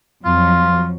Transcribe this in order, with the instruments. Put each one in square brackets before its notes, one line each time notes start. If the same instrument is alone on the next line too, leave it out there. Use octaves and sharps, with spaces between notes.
[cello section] F2 F3 F#3 [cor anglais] F4